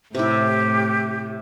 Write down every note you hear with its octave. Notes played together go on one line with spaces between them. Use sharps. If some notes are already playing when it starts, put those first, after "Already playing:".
A2 C3 E4 G4